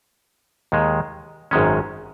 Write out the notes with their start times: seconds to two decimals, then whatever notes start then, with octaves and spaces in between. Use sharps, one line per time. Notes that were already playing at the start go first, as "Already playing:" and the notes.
0.72 D#2 D#3 G#3
1.51 G#1 F#2 D#3 G#3 C#4